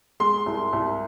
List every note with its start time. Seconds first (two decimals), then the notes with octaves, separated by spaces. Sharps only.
0.20 G#3 C6
0.46 C2
0.73 C2